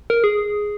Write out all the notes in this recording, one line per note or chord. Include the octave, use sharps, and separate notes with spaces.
A#4
G#4